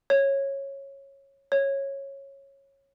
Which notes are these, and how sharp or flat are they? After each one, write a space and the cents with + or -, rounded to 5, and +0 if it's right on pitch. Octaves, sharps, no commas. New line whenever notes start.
C#5 -15
C#5 -15